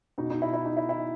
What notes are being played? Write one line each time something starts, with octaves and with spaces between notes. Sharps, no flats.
B2 D#4
D#4
E4
E4
D#4
E4
E4